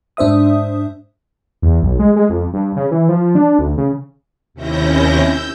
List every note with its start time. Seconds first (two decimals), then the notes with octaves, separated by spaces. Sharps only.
0.17 G#2 D4 C5 E5 D#6
1.62 E2
1.83 B1
1.99 G#3
2.16 G#3
2.30 F2
2.53 G2
2.76 C#3
2.91 E3
3.09 F3
3.35 D4
3.59 D2
3.78 C#3
4.54 D#2 C3 C#4 E4 G6 A#6
5.21 E6 G6